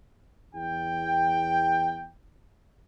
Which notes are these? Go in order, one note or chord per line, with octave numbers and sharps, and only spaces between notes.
E2 G5